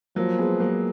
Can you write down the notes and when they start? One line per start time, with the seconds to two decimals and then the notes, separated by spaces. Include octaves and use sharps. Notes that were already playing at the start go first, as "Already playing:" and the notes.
0.16 F3 F#3 A#3
0.38 G#3 B3
0.60 F#3 A#3